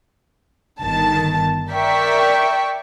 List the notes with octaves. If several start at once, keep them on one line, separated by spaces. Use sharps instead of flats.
G1 D#3 A5
A#4 D5 E5 G5 C#6 B6